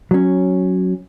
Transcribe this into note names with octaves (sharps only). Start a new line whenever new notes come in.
F#3 C#4